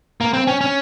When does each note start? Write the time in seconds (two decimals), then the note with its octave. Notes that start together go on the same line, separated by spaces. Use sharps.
0.21 A#3
0.33 C4
0.47 C#4
0.61 C#4